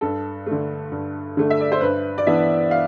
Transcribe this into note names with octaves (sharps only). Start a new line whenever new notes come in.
G2 A4
D3 A3
G2
D3 A3
E5
D5
C5
G2 B4
D5
E3 B3 D4 E5
F5